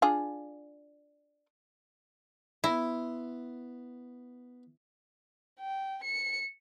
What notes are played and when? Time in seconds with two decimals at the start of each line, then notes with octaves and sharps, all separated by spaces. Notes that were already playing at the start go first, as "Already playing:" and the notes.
0.02 D4 F4 G#4
2.64 B3 E4 C6
5.60 G5
6.04 C#7